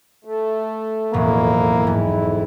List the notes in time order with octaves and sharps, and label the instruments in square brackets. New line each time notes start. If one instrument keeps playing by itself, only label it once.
[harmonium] A3
[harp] E1 A2 F#3 [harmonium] F2 E4 [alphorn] A#3
[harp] G#2